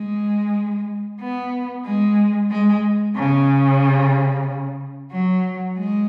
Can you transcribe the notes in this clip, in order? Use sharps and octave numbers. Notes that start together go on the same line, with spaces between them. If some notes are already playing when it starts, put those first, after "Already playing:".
Already playing: G#3
B3
G#3
G#3
C#3
F#3
G#3